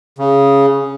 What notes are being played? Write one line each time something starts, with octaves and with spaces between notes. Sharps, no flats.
C#3